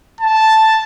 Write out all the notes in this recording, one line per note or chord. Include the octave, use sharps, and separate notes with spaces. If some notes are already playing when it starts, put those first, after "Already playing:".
A5